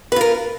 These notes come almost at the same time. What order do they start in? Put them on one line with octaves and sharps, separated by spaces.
B4 F4 A#4